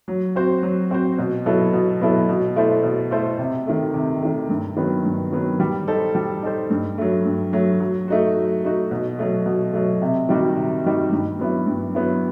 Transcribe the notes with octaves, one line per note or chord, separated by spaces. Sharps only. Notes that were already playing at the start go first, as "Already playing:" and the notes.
F#3
C4 F#4 C5
F#3
C4 F#4 C5
B2
F#3 B3 E4 A4
B2
F#3 B3 E4 A4
B2
A3 E4 A4 C5
B2
A3 E4 A4 C5
C3
D#3 A3
C3
D#3 A3
G2
D#3 F#3 B3
G2
D#3 F#3 B3
G3
D#4 A4 C5
G3
D#4 A4 C5
G2
F#3 A3
G2
F#3 A3
F#3
A3 D#4 F#4
F#3
A3 D#4 F#4
B2
F#3 A3
B2
F#3 A3
C3
D#3 G3 D#4 F#4
C3
D#3 G3 D#4 F#4
G2
F#3 B3 E4
G2
F#3 B3 E4